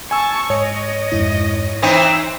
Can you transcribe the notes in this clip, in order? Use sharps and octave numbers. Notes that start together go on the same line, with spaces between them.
G#5 A5 C#6 E6
G#2 C#5 D#5 C#6 D#6
F2 G#2 E4
E3 C4 D#4 B6